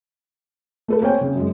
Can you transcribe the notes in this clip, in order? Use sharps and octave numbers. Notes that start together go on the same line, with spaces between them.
A3 A4 B4
A#3 C4 G#4 C#5 G5 G#5
C#3
F#2 G#3